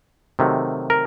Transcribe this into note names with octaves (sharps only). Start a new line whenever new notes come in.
C3 D#3 F#3 A3
A#4